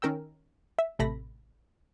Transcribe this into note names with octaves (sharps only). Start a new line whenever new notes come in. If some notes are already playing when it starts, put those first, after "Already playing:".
D#3 C#4 A#4 G5 E6
E5
A1 C3 A3 A4 B5 A#6